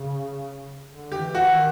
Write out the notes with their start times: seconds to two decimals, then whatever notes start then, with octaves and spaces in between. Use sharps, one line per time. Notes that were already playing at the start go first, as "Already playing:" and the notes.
Already playing: C#3
0.88 D3
1.12 G4
1.19 E3
1.35 F#4
1.51 D#3